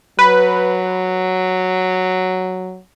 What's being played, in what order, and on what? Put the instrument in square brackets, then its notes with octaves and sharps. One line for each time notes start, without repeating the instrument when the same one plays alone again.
[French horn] F#3 [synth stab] B4